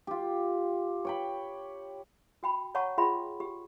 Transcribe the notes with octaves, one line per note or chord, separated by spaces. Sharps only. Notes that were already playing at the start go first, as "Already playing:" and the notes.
F4 G4
C#5 G5 B5
F#4 G5 B5
C#5 F#5 A5 A#5 C#6
F4 G#4 E5 G5 B5 C6
G4